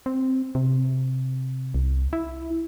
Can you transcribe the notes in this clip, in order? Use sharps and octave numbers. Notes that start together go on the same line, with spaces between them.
C4
C3
C2
E4